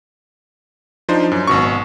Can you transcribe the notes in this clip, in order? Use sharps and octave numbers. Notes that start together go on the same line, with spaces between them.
F3 D4 D#4 C5
F#2
G#1 B2 C#6